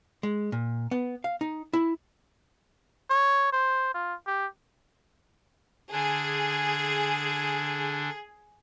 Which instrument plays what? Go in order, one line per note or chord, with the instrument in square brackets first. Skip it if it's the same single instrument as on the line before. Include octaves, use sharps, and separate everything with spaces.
[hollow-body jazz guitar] G#3
A#2
B3
F5
D#4
E4
[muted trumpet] C#5
C5
F4
G4
[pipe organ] D3 D4 [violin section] G#4